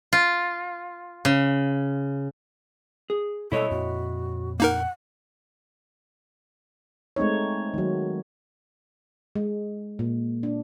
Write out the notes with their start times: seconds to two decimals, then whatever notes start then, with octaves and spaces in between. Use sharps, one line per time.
0.13 F4
1.25 C#3
3.10 G#4
3.52 B2 G3 G#3 E4 A4 C#5 D#5
3.71 F2 A#2 C4 F#4
4.60 A#3 D#4 A#4 F#5
7.16 G#3 A3 C4 D#4 C#5
7.74 D#3 F#3
9.35 G#3
9.99 A#2
10.43 D4